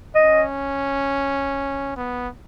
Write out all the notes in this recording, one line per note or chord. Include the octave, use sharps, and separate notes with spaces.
C#4 D#5
B3